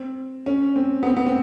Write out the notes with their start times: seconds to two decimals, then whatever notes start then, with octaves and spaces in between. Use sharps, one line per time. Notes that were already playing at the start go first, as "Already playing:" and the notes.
Already playing: C4
0.46 C#4
0.76 C4
1.03 B3
1.06 C4
1.17 B3
1.27 C4